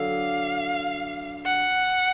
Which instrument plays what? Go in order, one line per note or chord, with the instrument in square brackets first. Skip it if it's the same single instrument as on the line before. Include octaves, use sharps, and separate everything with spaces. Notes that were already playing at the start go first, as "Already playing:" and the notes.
Already playing: [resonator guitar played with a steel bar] D3 F#3 [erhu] F5
[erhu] F#5